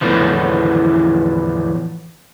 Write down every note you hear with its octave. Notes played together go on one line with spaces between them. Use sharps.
E2 A2 D3 E3 F3